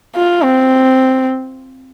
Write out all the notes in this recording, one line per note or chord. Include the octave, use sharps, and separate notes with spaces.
F4
C4